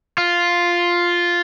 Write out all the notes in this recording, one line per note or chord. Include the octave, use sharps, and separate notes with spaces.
F4